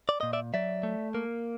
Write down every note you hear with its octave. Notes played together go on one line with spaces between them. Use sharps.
D5
A#2 D#5
D5 E5
F#3 D5 E5
A3
A#3